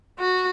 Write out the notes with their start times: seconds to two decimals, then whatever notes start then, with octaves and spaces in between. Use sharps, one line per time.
0.19 F#4